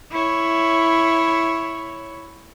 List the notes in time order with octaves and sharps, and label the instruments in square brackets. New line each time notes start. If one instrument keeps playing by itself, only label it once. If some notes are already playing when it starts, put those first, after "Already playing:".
[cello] E4 C#5